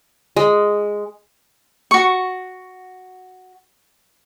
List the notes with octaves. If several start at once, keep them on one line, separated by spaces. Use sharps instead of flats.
G#3
F#4 C#6